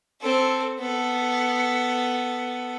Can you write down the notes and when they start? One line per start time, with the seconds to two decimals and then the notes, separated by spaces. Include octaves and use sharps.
0.21 C4 A4
0.79 B3 A4